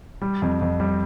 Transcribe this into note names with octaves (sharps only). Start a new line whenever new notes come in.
G3
F2
F2
G3